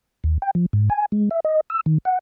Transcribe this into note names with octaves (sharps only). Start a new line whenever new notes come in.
D#2
G5
F3
G#2
G#5
G#3
E5
D#5
E6
D#3
F#5